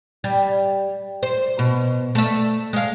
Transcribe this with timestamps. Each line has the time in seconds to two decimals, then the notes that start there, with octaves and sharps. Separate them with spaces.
0.24 G3
1.23 C5
1.59 B2
2.15 A3 E5
2.73 G#3 F5